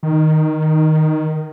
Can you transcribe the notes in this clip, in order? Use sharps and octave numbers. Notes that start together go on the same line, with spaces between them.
D#3